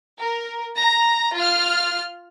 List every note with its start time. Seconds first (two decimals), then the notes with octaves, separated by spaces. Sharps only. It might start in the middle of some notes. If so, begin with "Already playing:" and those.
0.20 A#4
0.78 A#5
1.35 F4 F6